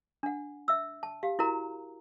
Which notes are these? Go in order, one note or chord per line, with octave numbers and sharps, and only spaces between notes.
D4 F#5
E5 E6
A5
G4 F5
E4 F#4 A#4 A#5